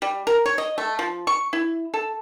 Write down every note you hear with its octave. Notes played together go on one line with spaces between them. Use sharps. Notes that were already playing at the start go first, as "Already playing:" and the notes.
G3
A#4
C#5
D#5
A3
F3
C#6
E4
A4